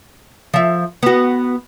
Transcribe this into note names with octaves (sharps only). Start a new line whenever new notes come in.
F3 E5
B3 F#4